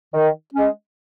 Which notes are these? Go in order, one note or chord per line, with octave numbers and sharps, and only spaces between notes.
D#3
G#3 C#4